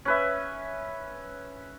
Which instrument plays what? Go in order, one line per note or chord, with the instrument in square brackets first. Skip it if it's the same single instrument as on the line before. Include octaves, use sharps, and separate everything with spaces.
[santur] C#4 B4 E5